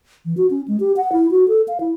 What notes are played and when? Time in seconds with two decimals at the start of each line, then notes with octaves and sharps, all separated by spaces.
0.25 E3
0.37 F#4
0.51 C#4
0.68 G#3
0.80 G4
0.97 F#5
1.12 E4
1.31 F#4
1.48 A4
1.68 F5
1.80 E4